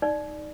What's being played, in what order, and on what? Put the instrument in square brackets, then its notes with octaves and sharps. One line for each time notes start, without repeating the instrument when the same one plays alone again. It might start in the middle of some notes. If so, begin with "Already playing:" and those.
[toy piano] D#4 D5